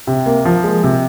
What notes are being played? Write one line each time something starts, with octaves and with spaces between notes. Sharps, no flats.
C3
A#3
F3
G#3
C3